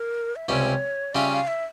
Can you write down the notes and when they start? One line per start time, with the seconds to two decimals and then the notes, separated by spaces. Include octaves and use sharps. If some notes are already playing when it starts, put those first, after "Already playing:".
Already playing: A#4
0.36 E5
0.48 C#2 C3 G3 C#4 C#5 E5
1.14 C#3 G3 C#4 F4 E5
1.31 F5
1.47 E5